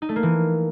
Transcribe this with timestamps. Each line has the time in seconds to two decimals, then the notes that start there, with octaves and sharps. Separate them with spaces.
0.02 D#4
0.09 A3
0.16 A#3
0.23 E3